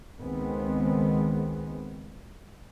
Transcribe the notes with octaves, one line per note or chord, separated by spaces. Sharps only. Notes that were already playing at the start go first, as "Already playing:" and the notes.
C#2 D#3 G#3 B3 C4